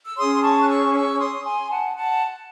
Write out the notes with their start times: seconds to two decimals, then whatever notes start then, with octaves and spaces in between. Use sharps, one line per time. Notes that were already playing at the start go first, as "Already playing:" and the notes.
0.06 E6
0.17 C#4 G#4 C#5 C6 D#6
0.35 C6
0.42 A5 C#6
0.61 F#6
0.68 C#6 E6
0.94 C#6 E6
1.19 C6 D#6
1.45 G#5 C6
1.70 F#5 A5
1.96 F#5 A5